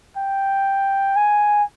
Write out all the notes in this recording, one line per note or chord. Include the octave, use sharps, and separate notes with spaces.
G5
G#5